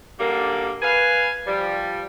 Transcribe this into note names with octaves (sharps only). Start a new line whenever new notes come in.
F#2 D3 G3 A#3
B4 F5 G#5
F3 G3